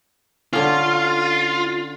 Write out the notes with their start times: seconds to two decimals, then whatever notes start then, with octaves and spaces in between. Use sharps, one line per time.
0.53 D3 C#4 F4